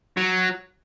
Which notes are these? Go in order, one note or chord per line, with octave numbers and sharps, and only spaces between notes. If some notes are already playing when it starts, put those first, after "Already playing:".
F#3